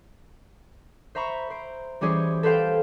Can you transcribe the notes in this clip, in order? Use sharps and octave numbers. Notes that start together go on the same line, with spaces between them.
C5 E5 A#5 B5 C#6
C5 D7
E3 G3 C#4 G4 G#4 C5
A4 B4 C5 F5 G5